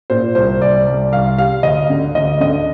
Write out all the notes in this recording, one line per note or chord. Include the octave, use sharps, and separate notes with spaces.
A#2 C5
C2 C5
C2 D5
C2 D5
C2 F5
G3 F5
D2 D#5
D3
D2 D#5
D3 D#5